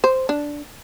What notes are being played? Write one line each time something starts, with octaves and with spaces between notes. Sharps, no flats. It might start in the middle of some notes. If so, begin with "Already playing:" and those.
C5
D4